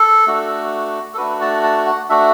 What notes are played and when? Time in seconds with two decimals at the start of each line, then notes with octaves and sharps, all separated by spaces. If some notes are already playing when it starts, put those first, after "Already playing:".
Already playing: A4
0.27 A3 D4 F#4
1.14 A4
1.17 A3 D4 F#4 B4
1.41 A5
1.63 A5
1.86 F#5
2.09 A3 D4 F#4 E5